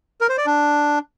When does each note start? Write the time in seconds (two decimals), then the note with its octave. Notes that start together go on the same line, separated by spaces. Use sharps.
0.21 A#4
0.29 C5
0.38 D5
0.46 D4